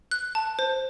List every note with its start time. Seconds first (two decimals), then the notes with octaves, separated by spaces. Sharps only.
0.11 F#6
0.35 A5
0.59 C5